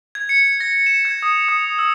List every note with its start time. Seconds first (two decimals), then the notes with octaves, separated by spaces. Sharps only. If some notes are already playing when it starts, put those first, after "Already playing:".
0.15 G#6
0.29 C#7
0.60 A#6
0.86 E7
1.05 G#6
1.23 D#6
1.49 D#6
1.79 E6